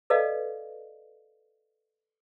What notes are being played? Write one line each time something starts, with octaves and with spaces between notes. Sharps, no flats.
A4 B4 D5 D#5 F5